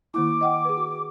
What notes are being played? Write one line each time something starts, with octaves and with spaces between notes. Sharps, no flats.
D#3 A#3 E4 D6
D#5 F#5 G5
G#4 B4
F#4